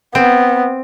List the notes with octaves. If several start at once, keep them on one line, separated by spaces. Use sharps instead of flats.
B3 C4